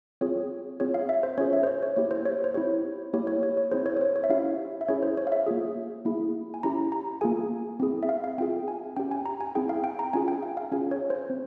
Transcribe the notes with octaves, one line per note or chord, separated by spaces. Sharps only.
C4 F4 G#4 C#5
C4 F4 G#4 C#5
F5
E5
C5
C#4 F4 G#4 C#5
E5
C5
C#5
C#5
A#3 E4 G4 C#5
C5
C#5
C5
C4 E4 G4 C#5
A#3 E4 G4 C#5
C#5
C#5
C#5
C4 E4 G#4 C5
C#5
C#5
C5
C#5
E5
C#4 E4 G4 F5
E5
C#4 E4 G#4 C#5
C5
C#5
F5
E5
A#3 F4 G#4
A#3 E4 G#4
G#5
C#4 E4 G4 A#5
A#5
A#3 F4 G#4 G#5
C4 E4 G#4
E5
F5
F5
C4 F4 G#4 G5
G#5
C#4 G4 G5
G#5
A#5
G#5
C4 E4 G#4 G5
F5
G5
A#5
C#4 F4 G#4 G#5
G5
F5
F5
C#4 F4 G#4 G#5
C#5
C5
C4